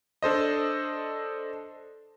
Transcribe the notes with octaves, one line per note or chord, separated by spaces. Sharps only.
D4 A4 C5 D#5